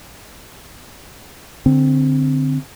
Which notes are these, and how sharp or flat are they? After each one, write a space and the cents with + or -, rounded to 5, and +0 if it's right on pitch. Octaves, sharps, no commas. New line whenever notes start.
D3 +0 C4 +0